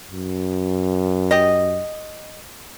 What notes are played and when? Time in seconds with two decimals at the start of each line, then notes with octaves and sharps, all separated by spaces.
0.11 F#2
1.31 G4 D#5